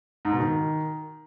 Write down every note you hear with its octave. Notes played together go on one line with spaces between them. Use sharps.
G#2
B2
D#3